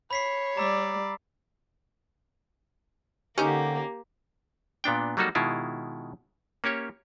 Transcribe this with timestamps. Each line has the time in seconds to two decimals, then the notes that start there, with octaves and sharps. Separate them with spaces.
0.11 C#5 B5 B6 C7
0.57 G3 D5 A#5 E6 B6
3.38 D3 A#3 C#4 D#4 G4
4.84 A#2 B3 D4 G5
5.17 F#3 G3 A#3 D#4 F#4 A4
5.35 B2 D#3 G#3 E4 F4
6.64 A#3 C#4 G4 C#5